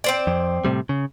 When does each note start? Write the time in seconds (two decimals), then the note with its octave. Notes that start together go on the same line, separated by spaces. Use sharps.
0.04 C4 C5 D5
0.27 F2
0.65 A2 C3 G3
0.89 C#3